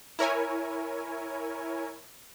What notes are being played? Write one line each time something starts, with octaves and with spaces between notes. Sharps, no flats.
E4 A#4 C#5 G#5